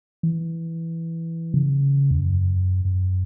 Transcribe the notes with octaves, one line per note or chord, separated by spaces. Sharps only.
E3
C#3
E2
F#2
F#2